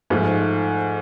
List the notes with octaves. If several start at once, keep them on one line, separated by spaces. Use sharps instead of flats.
G#2 F3 A3